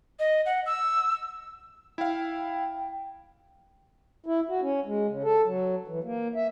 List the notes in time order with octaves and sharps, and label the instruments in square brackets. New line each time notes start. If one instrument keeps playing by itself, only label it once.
[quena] D#5
F#5
E6
[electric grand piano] E4 F5 [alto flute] G5
[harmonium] E4
F#4
C#4
G#3
C#3
A4
F#3
E3
A#3
E5